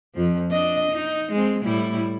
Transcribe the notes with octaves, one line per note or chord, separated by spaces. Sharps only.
F2 F3
D4 D#5
D#4
G#3 C4
A2 G3 E4